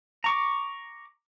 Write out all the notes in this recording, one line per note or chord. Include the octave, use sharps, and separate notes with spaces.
A#5 C#6 D6